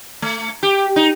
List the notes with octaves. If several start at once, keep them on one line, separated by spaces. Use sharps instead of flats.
A3
G4
D#4